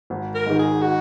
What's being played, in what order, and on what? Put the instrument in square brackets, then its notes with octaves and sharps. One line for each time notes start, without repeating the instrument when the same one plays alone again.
[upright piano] G#1
[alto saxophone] A#4
[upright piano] G#2 D#3
[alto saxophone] G#4
F#4